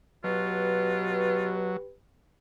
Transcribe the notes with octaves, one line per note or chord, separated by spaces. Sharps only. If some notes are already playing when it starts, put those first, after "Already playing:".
B2 F#3 F4 G4 B4